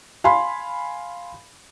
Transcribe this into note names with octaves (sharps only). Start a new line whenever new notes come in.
F5 G#5 B5 C6